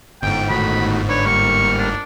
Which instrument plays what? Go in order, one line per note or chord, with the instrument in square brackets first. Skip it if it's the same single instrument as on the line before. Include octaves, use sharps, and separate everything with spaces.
[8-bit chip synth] G1 G#2 [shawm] G5
[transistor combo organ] A2 D#3 F#4 [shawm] B5
[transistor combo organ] D4 B4 [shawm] C#5
[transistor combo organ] G3 A#3 F6 [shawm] C#6
[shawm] D4